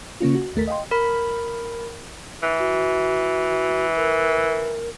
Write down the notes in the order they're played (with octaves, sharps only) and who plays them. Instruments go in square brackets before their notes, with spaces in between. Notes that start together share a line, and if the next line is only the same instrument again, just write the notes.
[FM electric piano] C#3 A#3 C#4 F4
F#4
G1 D#2 A3 A#4 B6
D#5 F5 G5 C6
[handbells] A#4 B5
[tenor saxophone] E3
[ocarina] F#4
A#4